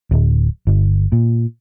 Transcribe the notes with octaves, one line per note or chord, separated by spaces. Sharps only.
D1
G1
A#2